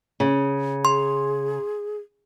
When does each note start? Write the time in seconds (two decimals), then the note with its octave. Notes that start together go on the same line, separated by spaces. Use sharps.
0.20 C#3
0.85 G#4 C6